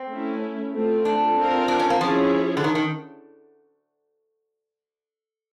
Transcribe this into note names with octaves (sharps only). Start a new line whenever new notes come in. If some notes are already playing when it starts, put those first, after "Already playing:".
Already playing: C4
A3 C#4 E4
A3 C4 F4
D4
C4 F4 A#4
D4
C#4
A#3
F3 C#4 E4 G#4 C#5
D3
D#3
D#3